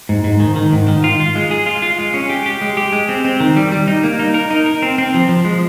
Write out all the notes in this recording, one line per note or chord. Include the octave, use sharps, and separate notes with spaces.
G#2
G#2
D#3
D#3
G#2
D#3
F4
F4
G#3
G#4
F4
F4
G#3
C#4
G4
G4
G#3
G4
G#3
C4
C4
D#3
G3
G3
D#4
A#3
D#4
A#4
D#4
A#4
C4
C4
F3
F3
G#3